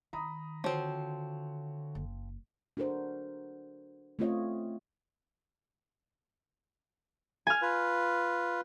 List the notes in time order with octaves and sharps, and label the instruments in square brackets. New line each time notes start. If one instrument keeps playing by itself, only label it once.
[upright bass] D#3 [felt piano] A#5 B5 D#6
[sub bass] D3 [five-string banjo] F3 C4 [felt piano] F#4 C#5
[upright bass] F#1
[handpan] D4 F#4 A4 A#4 C5
A3 C4 C#4 F4 C#5 D#5
[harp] G#5 F6
[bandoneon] F4 B4